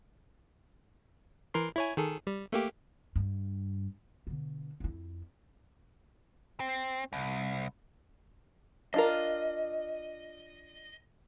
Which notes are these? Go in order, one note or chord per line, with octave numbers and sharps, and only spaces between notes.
E3 A#4 C6
E4 C#5 G#5
D#3 G#4 A4
G3
A3 A#3 G4
G2
B2 D3
F2 E4
C4
C2
D4 F4 A#4 D#5